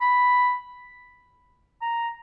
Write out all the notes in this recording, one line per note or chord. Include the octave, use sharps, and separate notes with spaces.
B5
A#5